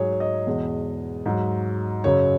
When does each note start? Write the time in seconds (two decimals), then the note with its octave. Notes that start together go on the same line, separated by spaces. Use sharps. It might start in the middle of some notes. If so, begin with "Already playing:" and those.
Already playing: G#2 F#3 G#4 C#5
0.12 C#5
0.20 D#5
0.47 E2 B2 G#3
1.26 G#2 F#3
2.04 F#2 C#3 F#3 C#5